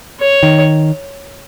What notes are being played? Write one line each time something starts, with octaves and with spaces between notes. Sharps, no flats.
C#5
D#3